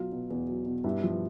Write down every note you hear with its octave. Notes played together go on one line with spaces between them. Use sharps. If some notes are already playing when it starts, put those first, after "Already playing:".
Already playing: B2 F#3 F4 F5
B2
E2
F#3
B2
G2 E4 E5
F3